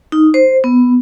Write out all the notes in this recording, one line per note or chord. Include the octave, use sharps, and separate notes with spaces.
D#4
C5
B3